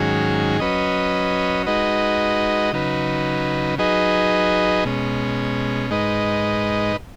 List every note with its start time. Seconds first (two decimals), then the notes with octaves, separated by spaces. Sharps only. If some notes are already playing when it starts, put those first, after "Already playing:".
Already playing: G#2 D#3 F#3 C#4 G#4
0.60 F#3 C#4 B4 D#5
1.66 G#3 D#4 F#4 B4 D#5
2.73 C#3 F#3 D#4 B4
3.78 F#3 D#4 G#4 B4 D#5
4.85 B2 G#3 C#4
5.90 G#2 G#3 D#4 B4 D#5